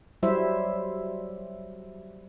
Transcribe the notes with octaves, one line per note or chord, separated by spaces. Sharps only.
F#3 G3 E4 C5 E5